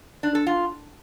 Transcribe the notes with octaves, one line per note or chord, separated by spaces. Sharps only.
D4
A4
F4